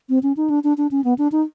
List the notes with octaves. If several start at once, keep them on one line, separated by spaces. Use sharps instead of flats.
C4
C#4
D#4
D4
D4
D4
C#4
B3
D4
D#4